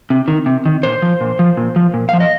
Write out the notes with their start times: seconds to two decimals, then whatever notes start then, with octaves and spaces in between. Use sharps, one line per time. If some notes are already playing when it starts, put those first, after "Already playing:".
0.10 C3
0.28 D#3
0.46 C3
0.66 D#3
0.83 A#2 C5
1.02 F3
1.21 A#2
1.39 F3
1.57 A#2
1.76 F3
1.94 A#2
2.09 F3 F5
2.20 D#5